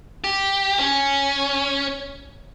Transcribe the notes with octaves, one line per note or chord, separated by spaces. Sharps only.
G4
C#4